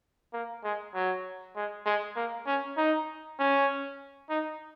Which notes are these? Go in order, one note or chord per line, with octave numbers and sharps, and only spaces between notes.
A#3
G#3
F#3
G#3
G#3
A#3
C#4
D#4
C#4
D#4